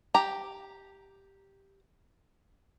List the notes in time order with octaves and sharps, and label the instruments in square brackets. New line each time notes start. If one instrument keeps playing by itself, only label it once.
[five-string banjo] G4 A#5